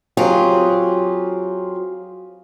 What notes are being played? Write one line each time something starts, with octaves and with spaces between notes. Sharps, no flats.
F#3 C4 F4 G4 G#4